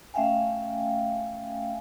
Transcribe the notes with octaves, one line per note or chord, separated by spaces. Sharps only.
A3 C#4 E5 F5 G5 G#5